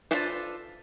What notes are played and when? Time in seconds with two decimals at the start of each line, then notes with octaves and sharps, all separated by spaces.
0.11 D4 F4 A4 B4 C5